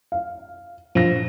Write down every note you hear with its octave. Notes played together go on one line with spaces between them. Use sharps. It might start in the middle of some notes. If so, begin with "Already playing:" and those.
F5
A#1 F3 A#6